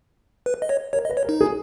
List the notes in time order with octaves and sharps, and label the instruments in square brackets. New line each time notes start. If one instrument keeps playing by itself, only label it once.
[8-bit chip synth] B4
D#5
C#5
[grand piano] A#4 [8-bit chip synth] C#5
[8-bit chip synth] D#5
[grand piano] B4
[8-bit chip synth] C#5
[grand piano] A#4
[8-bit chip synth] D#4
[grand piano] G#4